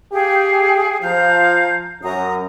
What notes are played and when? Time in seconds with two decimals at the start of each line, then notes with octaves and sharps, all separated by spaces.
0.13 G4 G#4 F5 G5
1.03 F3 F5 A#5 G6
2.03 F#2 A#5 D#6